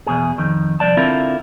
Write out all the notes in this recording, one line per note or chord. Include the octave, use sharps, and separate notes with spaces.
E2 B2 G#4
F2 D#3
C2 G2 F3 D5 A5
D3 C4 E4 F4 A#4